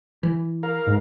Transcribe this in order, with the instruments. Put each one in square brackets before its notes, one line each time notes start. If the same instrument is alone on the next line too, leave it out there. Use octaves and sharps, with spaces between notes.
[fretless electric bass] E3
[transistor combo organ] A#4 F5
[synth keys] G#2